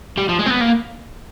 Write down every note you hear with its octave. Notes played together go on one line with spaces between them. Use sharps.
G3
F3
G#3
C4
B3
A#3